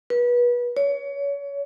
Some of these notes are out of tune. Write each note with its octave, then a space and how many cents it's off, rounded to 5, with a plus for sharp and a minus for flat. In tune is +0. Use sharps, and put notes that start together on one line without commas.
B4 -30
C#5 +30